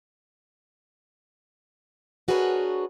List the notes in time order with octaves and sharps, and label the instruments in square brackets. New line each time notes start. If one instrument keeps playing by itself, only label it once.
[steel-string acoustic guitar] D4 F#4 G#4 A#4 B4 C#5